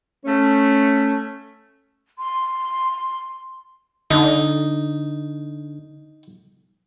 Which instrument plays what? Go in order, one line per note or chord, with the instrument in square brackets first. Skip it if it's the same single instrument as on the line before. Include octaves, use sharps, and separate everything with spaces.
[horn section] A3 C#4
[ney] C6
[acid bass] D3 [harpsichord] D#4